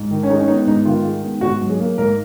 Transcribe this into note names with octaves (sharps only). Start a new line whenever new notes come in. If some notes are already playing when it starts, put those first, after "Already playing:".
Already playing: G#2
D#3
C#4
G#3 D#4
C#4
B3 D#4
G#2 D#4
D#3 F4
G#3
B3
G#2 F#4
F#3
G#4
A#3
G#2 A#4